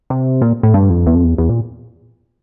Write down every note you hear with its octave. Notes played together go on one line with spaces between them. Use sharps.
C3
A#2
A2
G2
F2
E2
F2
E2
E2
A#2